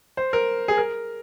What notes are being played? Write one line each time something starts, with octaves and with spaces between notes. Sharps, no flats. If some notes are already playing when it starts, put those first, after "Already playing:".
C5
A#4
G#4
A#4